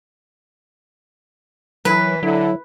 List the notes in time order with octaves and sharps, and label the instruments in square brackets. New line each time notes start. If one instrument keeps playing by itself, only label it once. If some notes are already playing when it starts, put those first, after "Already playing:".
[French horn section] E3 [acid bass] F#3 [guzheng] B4
[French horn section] D3 [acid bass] F#3 [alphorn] E4